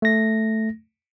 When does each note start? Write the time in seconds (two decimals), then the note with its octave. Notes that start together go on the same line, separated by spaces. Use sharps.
0.02 A3 A#6